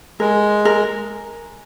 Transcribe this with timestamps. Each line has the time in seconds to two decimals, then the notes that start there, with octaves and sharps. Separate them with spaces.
0.20 G#3 A#4
0.65 A#4